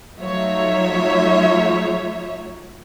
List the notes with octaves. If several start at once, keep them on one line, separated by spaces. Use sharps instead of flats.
F#3 A3 D#4 F4 C#5 E5